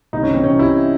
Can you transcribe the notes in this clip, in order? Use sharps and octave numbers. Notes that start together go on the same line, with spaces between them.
C2 D#4
C#4
E3 C4
C2 C#4
C3 E4